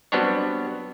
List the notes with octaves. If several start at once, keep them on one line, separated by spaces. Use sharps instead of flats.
F#3 G3 B3 C4 D4 C#5